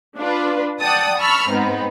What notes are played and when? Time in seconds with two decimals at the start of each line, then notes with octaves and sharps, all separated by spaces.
0.18 D4 F4 B4
0.81 D5 F#5 G5 A5 D#6
1.18 A5 B5 C#6 E6 F6
1.49 G#2 B3 C4 D#4